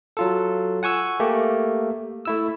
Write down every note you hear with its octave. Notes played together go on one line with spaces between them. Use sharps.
F#3 F4 A4
F#5 G#5 C#6 E6
A3 A#3 G4
A3 E4 E6